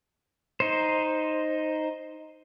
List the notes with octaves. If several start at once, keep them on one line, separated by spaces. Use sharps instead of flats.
D#4 C5